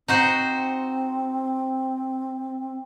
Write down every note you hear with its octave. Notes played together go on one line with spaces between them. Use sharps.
C4 D#4 F#4 C5